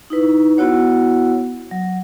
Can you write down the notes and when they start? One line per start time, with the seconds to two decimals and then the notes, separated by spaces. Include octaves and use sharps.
0.10 D#4 E4 B4
0.57 B3 E4 F#4 C#5 F#5
1.71 F#3